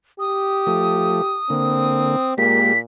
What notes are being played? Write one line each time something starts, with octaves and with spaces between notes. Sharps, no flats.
G4 D#6
F3 A3
D3 A#3 C4
A#2 G#3 A#3 G4 B6